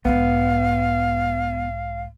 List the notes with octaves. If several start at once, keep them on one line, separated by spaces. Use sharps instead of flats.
B1 G#2 B3 F5